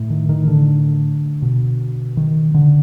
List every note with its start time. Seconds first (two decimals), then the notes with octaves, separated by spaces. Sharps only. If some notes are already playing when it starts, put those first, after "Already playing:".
Already playing: A2
0.10 D#3
0.29 D#3
0.48 D3
1.42 B2
2.17 D#3
2.54 D3